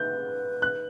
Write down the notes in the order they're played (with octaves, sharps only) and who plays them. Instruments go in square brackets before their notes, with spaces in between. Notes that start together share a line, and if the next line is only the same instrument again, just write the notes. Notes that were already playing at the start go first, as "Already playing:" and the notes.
Already playing: [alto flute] B4 [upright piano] G6
[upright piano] F#6